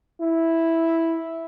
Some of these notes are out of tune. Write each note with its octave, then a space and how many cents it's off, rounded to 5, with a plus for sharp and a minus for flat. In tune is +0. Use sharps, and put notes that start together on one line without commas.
E4 -5